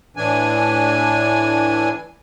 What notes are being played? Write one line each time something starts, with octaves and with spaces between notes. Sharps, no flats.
A2 E3 D4 G#5